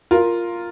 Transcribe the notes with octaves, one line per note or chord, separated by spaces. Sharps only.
F4 A#4